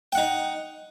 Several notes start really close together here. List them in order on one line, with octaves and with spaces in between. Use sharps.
G5 F#5 D#4